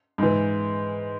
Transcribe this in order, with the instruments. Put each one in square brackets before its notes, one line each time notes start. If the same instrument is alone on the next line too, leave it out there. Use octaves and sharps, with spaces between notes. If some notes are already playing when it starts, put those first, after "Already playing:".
[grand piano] G#2 E3